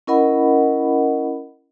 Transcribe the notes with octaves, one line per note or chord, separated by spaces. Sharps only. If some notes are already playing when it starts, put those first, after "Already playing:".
C#4 E4 A#4 D#5 F#5 B5